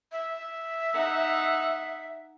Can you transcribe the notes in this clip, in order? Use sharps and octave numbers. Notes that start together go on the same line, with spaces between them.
E5
D#4 F#5